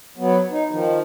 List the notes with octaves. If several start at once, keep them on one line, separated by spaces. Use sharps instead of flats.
F#3 B3
D#4
D#3 F3